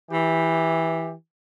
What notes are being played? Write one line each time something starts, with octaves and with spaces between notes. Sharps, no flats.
E3 G4